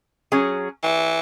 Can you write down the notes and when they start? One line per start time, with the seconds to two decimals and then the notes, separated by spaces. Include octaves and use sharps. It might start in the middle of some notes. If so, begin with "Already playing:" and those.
0.32 F#3 C#4 G#4
0.83 E3